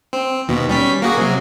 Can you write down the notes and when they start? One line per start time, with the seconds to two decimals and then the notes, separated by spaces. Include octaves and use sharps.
0.13 C4
0.48 D#2 B2
0.69 G3 C#4 B6
1.02 A#3 F#4 G#4
1.17 C3 F#3